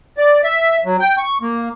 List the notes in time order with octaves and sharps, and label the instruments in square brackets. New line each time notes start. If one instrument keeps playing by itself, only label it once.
[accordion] D5
E5
F#3
G5
C#6
A#3